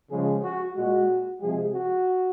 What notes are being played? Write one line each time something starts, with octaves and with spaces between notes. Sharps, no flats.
C#3 F3 G#3 G#4
F#4
A#2 G#3 F#4
C3 F3 G#3 G#4
F#4